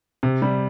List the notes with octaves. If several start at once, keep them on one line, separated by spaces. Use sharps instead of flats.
C3
G3